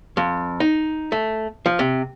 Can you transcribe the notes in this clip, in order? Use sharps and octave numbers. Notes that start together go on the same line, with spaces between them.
F2
D#4
A3
F3
C3